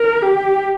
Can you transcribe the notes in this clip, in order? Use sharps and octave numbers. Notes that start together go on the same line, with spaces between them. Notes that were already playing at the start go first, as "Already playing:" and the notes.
Already playing: A#4
G4